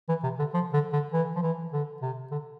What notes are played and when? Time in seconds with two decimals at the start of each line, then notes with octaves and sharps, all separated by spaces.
0.09 E3
0.24 C3
0.39 D3
0.54 F3
0.73 D3
0.93 D3
1.13 E3
1.35 F3
1.42 E3
1.73 D3
2.02 C3
2.31 D3